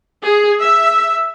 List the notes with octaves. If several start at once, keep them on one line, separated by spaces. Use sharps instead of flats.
G#4
E5